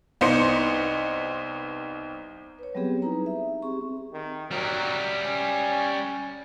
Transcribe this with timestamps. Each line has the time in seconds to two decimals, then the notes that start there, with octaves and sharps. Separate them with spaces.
0.21 C2 B3 D#4 C5 C6 C#7
2.59 B4 C#5
2.75 F#3 G3 B3 C4 G4 G#4
3.02 D#4 E4 B4 A#5
3.26 E5
3.62 C4 G4 G#4 C#6
4.13 D#3
4.51 F#3 G3 A#4
5.26 C#4